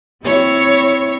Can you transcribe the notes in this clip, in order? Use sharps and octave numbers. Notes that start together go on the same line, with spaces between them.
C4 E4 C#5